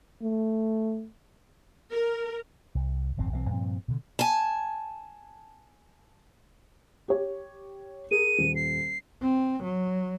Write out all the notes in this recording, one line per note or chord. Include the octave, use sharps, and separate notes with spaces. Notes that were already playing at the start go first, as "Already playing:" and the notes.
A3
A#4
C2
D#1 G#1 F2 C4
B1 E3 F#3 C4
G2 A#2 F3 C4
B2 D3
G#5 A5
G4 C#5
G#4 A#4 D#7
D#1
C7
C4
F#3